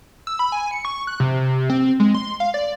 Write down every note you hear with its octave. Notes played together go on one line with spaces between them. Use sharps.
E6
B5
G#5
C#7
C#6
F#6
C3
C4
G#3
C6
F5
D5